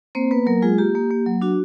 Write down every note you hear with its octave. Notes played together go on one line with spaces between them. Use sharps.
A#3 C4 C5
A#3 B3 B4
F#3 A#3 A#4
G#3 F4 G#4
A#3 G4
A#3
A#3
F#3
D4 F#4